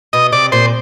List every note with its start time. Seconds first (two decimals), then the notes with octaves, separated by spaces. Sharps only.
0.13 B2 D#5
0.32 C3 D5
0.52 A#2 C5